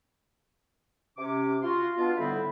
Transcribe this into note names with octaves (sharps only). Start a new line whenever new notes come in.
C3 C#4 D6
F4 F#4 C6
B2 B3 D4 F4
A2 D3 G3 B3 C4 B5